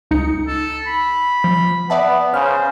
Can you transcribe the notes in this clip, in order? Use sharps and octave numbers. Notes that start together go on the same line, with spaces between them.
C#2 D#4 C#7
A4
B5
F3
B3 D5 E5 A5
C#3 C5 F6